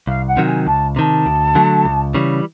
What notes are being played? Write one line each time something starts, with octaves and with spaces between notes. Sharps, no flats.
C2 F5
F#5
C3 D#3 F#3
G#5
C#2 A5
C3 D#3 A5 A#5
D2
D3 F#3 A3
C#2
C#3 E3 G3